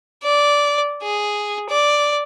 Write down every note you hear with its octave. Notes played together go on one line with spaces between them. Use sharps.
D5
G#4
D5